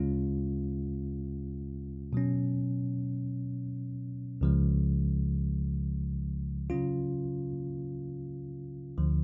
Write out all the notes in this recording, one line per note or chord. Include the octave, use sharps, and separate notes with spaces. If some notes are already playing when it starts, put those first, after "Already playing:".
Already playing: D2 C#3 G#3 C#4 F4
B2 F#3 C#4
C#2 C#3 F3 G#3
C#3 F#3 C#4 F4
D2 D3 F3